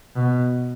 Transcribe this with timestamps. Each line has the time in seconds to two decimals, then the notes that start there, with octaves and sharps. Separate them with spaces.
0.16 B2